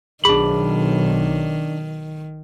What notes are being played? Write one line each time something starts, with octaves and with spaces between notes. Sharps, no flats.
B1 D#3 D4 G#4 B5